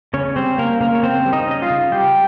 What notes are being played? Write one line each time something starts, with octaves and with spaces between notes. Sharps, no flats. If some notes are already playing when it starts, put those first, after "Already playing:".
C#3 C#4 C#5
G3 C4 C5
A#3 C#4 A#4
C#3 A#3 A#4
C#5
C#3 C4 C5
G3
D#4 D#5
C#4 D#5
F4 F5
C#3
G3 G4 G5